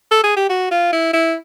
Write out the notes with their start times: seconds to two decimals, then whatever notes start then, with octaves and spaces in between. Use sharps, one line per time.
0.11 A4
0.24 G#4
0.36 G4
0.49 F#4
0.71 F4
0.92 E4
1.13 E4